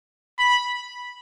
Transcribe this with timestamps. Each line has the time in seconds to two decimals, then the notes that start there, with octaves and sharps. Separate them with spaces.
0.39 B5